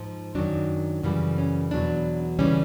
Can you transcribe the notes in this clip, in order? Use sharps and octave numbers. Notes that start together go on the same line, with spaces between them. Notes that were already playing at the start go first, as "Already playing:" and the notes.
Already playing: G#2 F3
F#2 D#3 F#3 D4
F#2 C#3 E3 G3
C#4
E2 B2 F#3 D4
C#3 E3 G3 C#4